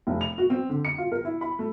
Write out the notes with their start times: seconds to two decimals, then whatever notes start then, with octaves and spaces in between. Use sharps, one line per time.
0.07 F1
0.21 F7
0.38 F#4
0.50 C4
0.69 D3
0.85 C#7
0.98 F4
1.12 A#4
1.25 E4
1.41 B5
1.59 A3